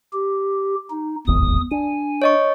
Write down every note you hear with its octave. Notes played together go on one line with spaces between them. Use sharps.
G4
D#4
D1 G#1 E2 D#6
D4 G#5
C#5 D#5 C#6